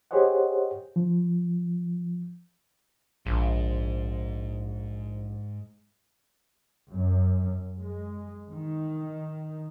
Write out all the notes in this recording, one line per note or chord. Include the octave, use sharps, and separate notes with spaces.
G4 G#4 C5 C#5 D#5 F#5
F3
A#1 G#2
F#2
G#3
D#3